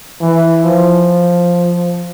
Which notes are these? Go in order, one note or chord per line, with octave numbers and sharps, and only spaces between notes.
E3
F3